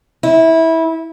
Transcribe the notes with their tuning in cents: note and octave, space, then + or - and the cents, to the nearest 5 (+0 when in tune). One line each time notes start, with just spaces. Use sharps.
E4 -20